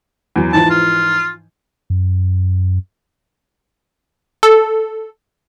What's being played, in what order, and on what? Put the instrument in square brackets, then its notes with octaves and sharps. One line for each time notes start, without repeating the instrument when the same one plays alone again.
[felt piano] E2 F#3
[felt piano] G#2 E3 F3 [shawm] A5
[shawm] F4
[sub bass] F#2
[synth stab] A4